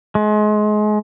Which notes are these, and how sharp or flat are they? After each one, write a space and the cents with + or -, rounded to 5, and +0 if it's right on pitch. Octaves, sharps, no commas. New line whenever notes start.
G#3 +30